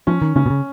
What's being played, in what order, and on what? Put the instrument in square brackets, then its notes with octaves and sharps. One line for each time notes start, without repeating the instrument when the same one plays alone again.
[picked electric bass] F3 [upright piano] C#4
[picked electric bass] D#3
[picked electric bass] C#3 [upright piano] C#4
[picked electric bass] B2
C#3